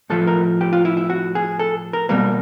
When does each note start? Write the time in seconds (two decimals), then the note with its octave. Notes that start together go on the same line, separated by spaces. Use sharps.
0.10 A2 F3 A3 A4
0.27 A#4
0.61 G4
0.73 F4
0.85 E4
0.97 E4
1.10 F#4
1.35 G#4
1.59 A4
1.93 A#4
2.09 B2 G3 A#3 A#4